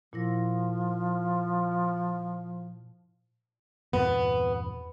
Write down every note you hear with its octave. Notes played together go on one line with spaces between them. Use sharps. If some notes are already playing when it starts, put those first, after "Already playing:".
A#2 F3 E4 A#6
E2 G2 A#2 B3